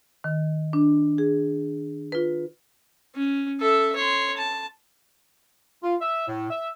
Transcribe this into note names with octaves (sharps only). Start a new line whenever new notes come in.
D#3
D4
G#4
F4 B4
C#4
A4 E5
C#5 C6
A5
F4
E5
A2
E5